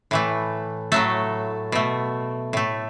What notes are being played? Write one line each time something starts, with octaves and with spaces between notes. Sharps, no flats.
A2 E3 A3
A2 F#3 A3 A4
B2 A3
A2 A3